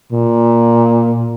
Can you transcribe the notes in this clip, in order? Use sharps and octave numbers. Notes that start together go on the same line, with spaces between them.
A#2